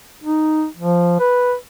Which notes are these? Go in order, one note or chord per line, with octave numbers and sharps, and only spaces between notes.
D#4
F3
B4